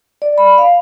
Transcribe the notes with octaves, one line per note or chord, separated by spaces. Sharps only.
D5
B5
F5